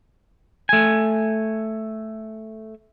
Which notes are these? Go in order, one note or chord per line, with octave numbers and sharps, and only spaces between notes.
A3 G#5